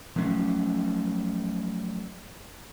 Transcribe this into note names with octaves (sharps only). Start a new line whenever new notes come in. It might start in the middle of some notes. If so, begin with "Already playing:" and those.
F3 F#3 A3 C#4